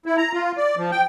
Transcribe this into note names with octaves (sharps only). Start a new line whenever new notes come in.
E4
A#5
F4
D5
F3
G5